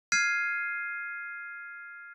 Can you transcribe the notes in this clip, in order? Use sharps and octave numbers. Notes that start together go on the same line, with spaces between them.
F6 G#6 C7 D#7